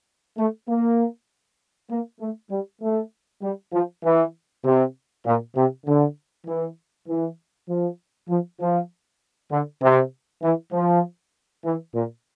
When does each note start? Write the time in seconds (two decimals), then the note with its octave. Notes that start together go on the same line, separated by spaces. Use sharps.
0.38 A3
0.68 A#3
1.90 A#3
2.20 A3
2.51 G3
2.82 A3
3.42 G3
3.73 F3
4.04 E3
4.64 C3
5.26 A#2
5.56 C3
5.86 D3
6.47 E3
7.08 E3
7.69 F3
8.29 F3
8.60 F3
9.52 D3
9.82 C3
10.43 E3
10.72 F3
11.65 E3
11.94 A#2